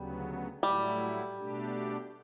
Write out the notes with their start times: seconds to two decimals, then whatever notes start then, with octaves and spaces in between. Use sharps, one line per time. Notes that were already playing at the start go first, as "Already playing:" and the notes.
Already playing: D2 C#3 F#3 G3 B3
0.62 A2 F#3 G3 A3 E4
1.37 B2 A3 D4 G4